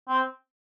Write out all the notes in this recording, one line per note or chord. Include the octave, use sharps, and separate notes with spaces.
C4